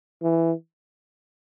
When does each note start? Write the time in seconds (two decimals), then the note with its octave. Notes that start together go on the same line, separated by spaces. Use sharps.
0.22 E3